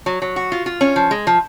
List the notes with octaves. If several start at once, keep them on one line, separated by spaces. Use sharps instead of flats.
F#3
F#3
F#4
F4
F4
C#4
F3
G#3
F3